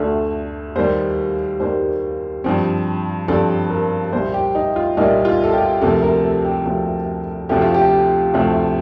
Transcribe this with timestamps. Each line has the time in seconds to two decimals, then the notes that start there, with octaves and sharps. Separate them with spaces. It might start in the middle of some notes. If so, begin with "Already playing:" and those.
Already playing: D2 D3 A3
0.76 D#2 D#3 G3 A#3 C5
1.60 D#2 D#3 G3 A#3 C5
2.44 G2 F3 C4
3.28 G2 F3 C4 A4
3.70 A#4
4.12 C2 A#2 G3 A#3 C5
4.34 G4
4.55 D#4
4.76 F4
4.97 C2 A#2 G3 A#3 D#4
5.25 F4
5.44 A4
5.53 G4
5.82 D2 C3 F3 A#3 A4
6.03 A#4
6.23 A4
6.45 G4
6.65 D2 C3 F3 A#3
7.49 D2 C3 F3 A3 G4
7.62 F4
7.74 G4
8.34 D2 C3 F3 A3